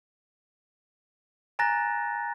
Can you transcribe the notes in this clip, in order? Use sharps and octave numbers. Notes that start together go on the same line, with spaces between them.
G#5 A#5 F#6 A6 A#6